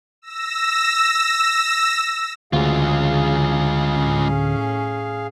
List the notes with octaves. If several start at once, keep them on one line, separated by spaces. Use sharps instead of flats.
E6 A#6
D2 C#3 E3 G#3 F4 G#4 F5
A2 C#4